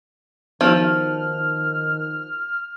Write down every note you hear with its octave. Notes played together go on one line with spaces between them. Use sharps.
D#3 F3 B3 D#4 F#4 F6